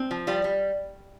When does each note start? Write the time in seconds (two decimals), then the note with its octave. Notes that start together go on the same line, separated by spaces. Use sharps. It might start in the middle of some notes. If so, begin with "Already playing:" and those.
Already playing: C4
0.11 F3
0.27 G3 F4
0.44 G3